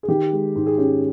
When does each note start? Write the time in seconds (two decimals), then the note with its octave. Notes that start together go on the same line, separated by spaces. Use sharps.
0.03 G#4
0.08 D#3 G4
0.32 G#3
0.56 G#2
0.66 G#4
0.78 C#4 G4